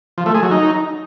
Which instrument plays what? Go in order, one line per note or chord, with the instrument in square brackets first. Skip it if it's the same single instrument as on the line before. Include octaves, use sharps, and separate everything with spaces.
[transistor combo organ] F3
A3
G#4
F#3
D#4